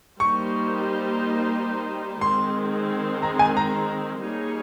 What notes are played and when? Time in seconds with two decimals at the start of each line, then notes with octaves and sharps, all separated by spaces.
0.20 G3 A#3 D#4 G4 C5 C#6
2.21 D#3 G#3 C4 C6
3.22 A#5
3.39 G#5
3.57 A#5
4.24 G3 A#3 D#4 G#4 C#5